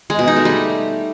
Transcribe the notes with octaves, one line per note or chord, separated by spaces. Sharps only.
G#3
B2
D#4
A3
G3